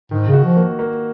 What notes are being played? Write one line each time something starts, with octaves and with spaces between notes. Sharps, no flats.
G#2 D#3
C#3
F#4
F3
A#3
A#3